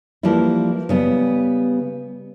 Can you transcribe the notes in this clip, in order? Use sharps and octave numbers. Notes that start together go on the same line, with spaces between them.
E3 F3 G3 A#3 E4
C#3 G3 B3